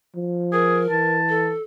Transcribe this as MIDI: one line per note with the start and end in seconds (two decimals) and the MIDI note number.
0.16 0.86 53
0.53 0.81 68
0.53 1.18 70
0.90 1.55 52
0.90 1.50 81
1.29 1.62 69